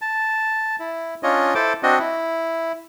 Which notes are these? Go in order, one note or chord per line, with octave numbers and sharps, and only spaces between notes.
A5
E4
C#4 D4 F4 C#5 D#5
E4 A4 C5 D6
C4 D4 F#4 D#5
E4